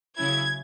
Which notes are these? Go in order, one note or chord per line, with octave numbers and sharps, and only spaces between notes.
C#3 F#3 C#4 E4 G#6